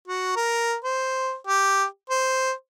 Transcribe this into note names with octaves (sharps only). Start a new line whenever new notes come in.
F#4
A#4
C5
G4
C5